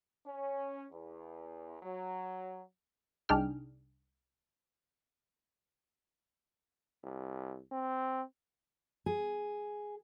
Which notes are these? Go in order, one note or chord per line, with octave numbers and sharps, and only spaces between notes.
C#4
E2
F#3
C2 D4 D#4 G#4 G5 F6
C2
C4
G#4